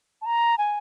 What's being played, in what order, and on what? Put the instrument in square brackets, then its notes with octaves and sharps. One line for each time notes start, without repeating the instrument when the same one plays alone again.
[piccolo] A5
A#5
G#5